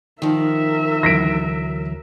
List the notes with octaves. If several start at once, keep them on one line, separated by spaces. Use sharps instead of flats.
D#3 F3 A#4 E5
D2 E3 F#3 A#6 B6 D7